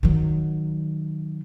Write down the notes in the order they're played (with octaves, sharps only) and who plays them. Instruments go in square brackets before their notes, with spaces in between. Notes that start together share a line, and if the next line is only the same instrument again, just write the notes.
[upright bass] D#3 F#3